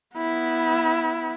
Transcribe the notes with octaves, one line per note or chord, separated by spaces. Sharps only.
B3 E4